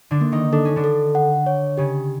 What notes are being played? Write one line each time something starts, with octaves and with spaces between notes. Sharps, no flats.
D3 D4
A#3
D#3 D#4
D4 A4
C#4
D3 D4
A4
F#5
C#5
C#3 C#4 G4